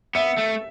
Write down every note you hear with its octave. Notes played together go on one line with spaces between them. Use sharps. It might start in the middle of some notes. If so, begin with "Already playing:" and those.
B3 E5
A3